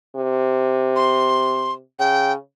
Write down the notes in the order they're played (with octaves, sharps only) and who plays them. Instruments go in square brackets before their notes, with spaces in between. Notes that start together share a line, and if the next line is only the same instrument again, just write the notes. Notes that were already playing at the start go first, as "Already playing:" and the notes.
[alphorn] C3
[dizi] C6
[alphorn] C#3 [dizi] G5